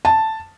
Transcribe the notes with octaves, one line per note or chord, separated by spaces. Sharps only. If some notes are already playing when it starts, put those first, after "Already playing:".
A5